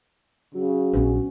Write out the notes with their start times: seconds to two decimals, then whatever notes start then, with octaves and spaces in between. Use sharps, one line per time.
0.55 C#3 F#3
0.93 A#1 B3 C#4 B4